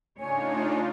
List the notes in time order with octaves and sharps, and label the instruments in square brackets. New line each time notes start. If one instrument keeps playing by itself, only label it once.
[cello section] C#3 A3 C#5 [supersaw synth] D4 D#4 F4 [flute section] G#5